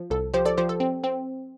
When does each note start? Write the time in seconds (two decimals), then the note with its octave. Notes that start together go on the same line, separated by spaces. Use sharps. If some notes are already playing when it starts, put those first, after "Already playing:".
Already playing: F3
0.10 C2 A4
0.34 F3 G4 C5
0.45 A4 D5
0.58 F3 G4 C5
0.69 A4
0.80 C4
1.04 C4